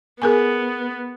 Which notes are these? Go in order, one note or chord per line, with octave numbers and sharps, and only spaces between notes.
B3 G#4 A#4 G#5